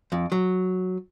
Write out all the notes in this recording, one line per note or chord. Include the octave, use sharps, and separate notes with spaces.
F2
F#3